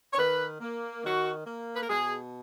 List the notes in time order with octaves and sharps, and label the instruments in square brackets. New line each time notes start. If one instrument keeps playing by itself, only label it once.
[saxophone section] C#5
D#3 B4
A#3
D#3 F#4
A#3
B4
A#4
B2 G#4